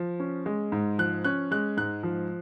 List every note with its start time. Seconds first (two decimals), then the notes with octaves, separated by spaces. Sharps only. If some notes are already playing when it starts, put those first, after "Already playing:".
Already playing: F3
0.20 C#4
0.46 G#3
0.72 G#2
0.98 F3 F#6
1.25 C#4 F#6
1.51 G#3 F#6
1.77 G#2 F#6
2.03 F3